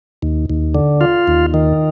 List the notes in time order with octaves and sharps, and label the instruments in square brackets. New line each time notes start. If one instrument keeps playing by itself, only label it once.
[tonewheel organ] D#2
D#2
D3
F4
D#2
D#3